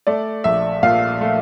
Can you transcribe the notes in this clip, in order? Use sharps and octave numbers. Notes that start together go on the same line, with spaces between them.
A3 D5
A#1 E5
A#2 F5
A3